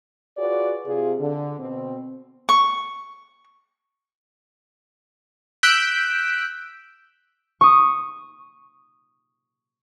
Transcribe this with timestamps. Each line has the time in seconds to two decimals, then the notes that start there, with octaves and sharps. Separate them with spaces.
0.38 F4 F#4 G#4 B4 C#5 D5
0.86 C3 F4 G#4
1.20 D3
1.59 B2 C4
2.49 C#6
5.63 E6 F#6 G6 B6 D7
7.61 C#6 D#6